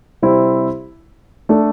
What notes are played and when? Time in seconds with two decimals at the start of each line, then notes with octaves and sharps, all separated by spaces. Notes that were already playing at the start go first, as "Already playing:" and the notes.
0.22 C3 G3 C4 E4
1.49 A3 D4 A4